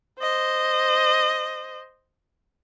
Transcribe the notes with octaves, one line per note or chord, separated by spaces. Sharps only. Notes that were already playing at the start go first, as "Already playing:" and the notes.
C5 D#5